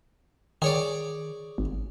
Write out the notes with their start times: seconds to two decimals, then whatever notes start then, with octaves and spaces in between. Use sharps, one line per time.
0.62 D#3 G#4 C#5 D5
1.58 G#1